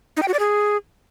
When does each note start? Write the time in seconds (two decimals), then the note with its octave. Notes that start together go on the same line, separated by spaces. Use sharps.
0.17 D#4
0.22 G5
0.28 F#4
0.34 D5
0.39 G#4